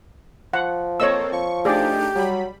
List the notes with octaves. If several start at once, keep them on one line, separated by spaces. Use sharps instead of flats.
F3 F#5
A#3 C4 A4 C#5 D#5 E6
F3 C#6
A3 D4 D#4 G4 G#4 D5
F#3 G3 B5